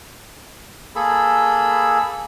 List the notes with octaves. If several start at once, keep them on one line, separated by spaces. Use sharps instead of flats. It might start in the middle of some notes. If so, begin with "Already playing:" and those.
A#3 G#4 A4 B5 E6